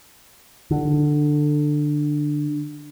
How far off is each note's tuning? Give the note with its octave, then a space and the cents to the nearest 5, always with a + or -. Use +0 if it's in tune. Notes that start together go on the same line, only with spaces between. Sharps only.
D3 +15